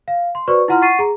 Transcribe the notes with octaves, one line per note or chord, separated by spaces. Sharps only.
F5
C6
F#4 B4 C5 D5 C#6
E4 F4 F#5 A#5 C6 F6
F#5 C#6 A6 C7 D#7
G#4 A#5